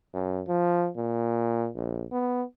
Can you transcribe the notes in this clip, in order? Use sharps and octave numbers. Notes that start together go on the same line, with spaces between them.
F#2
F3
A#2
A#1
B3